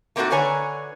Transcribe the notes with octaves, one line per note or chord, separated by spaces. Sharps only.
A3 A#3 C4 C#4 F#4 A4
D3 B4 C#5 G#5 A#5